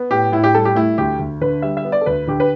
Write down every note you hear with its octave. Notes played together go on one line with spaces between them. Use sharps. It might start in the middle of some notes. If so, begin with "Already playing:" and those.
Already playing: B3
A2 G4
A2 E4
G4
G3 A4
G4
A3 E4
D2 G4
D2
D3 B4
G3 E5
E5
B3
D5
A4
D2 B4
D3 G4
B4